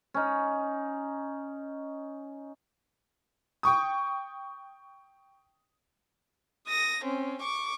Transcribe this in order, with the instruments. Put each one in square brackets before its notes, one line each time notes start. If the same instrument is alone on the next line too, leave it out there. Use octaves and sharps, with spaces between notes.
[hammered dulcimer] C#4 D#4
[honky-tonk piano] G5 C#6 D#6
[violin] D#6 A#6
C4 C#4
C#6 D6